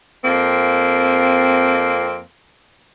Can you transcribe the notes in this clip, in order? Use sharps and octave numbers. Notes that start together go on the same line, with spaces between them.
F2 A#3 C4